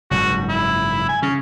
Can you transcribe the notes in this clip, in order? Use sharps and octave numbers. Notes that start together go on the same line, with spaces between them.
F#1 G#2 F#4
E4
G#5
C#3 C#4